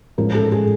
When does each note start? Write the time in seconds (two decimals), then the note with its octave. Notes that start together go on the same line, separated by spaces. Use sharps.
0.18 A1 G#2 F3 A#4
0.35 A4
0.52 G#4